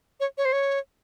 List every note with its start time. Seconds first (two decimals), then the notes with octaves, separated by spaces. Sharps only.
0.20 C#5
0.38 C#5
0.45 C5
0.53 C#5